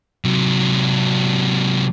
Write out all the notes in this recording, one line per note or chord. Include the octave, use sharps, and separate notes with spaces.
C3 F#3